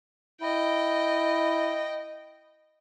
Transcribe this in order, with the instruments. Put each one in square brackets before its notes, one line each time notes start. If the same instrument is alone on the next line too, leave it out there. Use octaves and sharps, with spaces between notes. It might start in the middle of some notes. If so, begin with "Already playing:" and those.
[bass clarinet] E4 [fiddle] D#5 G5